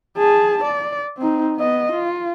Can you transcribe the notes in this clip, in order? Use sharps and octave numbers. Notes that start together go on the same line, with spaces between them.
G#4 A5
D5
C4 D#4
B3 D#5
F4